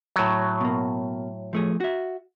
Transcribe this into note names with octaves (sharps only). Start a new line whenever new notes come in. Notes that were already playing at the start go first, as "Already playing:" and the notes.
A2 F#3
B2 A#3
F3 A3 G#4
F#4 E5